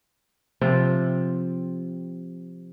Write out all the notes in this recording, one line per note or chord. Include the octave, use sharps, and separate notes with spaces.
C3 F3 C4